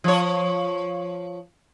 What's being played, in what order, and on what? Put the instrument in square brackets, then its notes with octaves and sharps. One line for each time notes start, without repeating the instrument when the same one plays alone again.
[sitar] F3 C#5